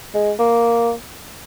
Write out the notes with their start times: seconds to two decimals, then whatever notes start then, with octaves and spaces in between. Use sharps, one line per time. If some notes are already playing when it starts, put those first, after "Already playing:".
0.14 G#3
0.39 A#3